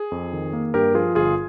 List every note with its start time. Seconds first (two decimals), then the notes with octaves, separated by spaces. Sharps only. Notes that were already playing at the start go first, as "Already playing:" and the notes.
Already playing: G#4
0.12 F2
0.33 D#3
0.53 A#3
0.74 G2 G4 A#4
0.95 F3 F4 G#4
1.15 G1 F4 G#4